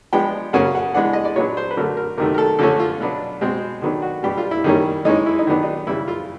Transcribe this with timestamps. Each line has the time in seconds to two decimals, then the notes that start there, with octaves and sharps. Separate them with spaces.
0.13 F3 G#3 B3 D4 G5
0.53 C#3 F#3 A#3 C#4 F#5
0.75 F#5
0.94 E3 G#3 B3 D4 F#5
1.13 D#5
1.25 D5
1.36 A#2 F#3 B3 D4 C#5
1.57 C5
1.71 B4
1.77 D3 F#3 A3 A#4
1.97 A#4
2.18 C3 D#3 F#3 A3 A#4
2.34 A#4
2.38 A4
2.59 D3 F3 A3 C#4 A4
2.79 F4
3.01 B2 F#3 B3 D4
3.41 B2 G#3 C4
3.82 D#3 F#3 B3 D4
4.02 F#4
4.23 B2 G3 B3 D4 G4
4.37 F4
4.51 E4
4.64 D#3 G3 A#3 C#4
5.05 E3 G#3 C#4 D#4
5.26 E4
5.39 D#4
5.47 D#3 F#3 B3 D4
5.63 D#4
5.87 C#3 E3 G3 E4
6.08 F4